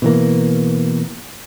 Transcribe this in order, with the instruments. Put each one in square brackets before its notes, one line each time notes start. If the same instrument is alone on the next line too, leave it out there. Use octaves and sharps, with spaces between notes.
[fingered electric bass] B2 E3 A#3